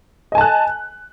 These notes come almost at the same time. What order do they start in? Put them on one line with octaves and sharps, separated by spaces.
D#5 G#5 A5 F#6